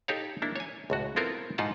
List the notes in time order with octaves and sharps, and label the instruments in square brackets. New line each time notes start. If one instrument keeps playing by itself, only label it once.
[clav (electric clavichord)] D#4 G4 A4 C#5 F5
A#3 D4 E4
C#5 G#5
C#2 A2 F#4
B3 C4 E4 F4 A4 A#4
G#2 D#4 F4 F#5 A5